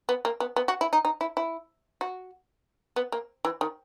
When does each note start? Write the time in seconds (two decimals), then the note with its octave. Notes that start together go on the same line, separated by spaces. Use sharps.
0.09 B3
0.25 A#3
0.40 B3
0.56 B3
0.68 F#4
0.81 E4
0.93 D#4
1.05 D#4
1.21 E4
1.37 E4
2.01 F#4
2.96 B3
3.12 A#3
3.45 E3
3.61 D#3